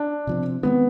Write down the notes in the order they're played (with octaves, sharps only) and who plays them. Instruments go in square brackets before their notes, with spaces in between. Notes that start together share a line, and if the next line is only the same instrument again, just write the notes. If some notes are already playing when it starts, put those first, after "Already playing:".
Already playing: [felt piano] D4
[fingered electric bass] C3 F3 C4
[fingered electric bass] D#3 G#3 C4 [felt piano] B3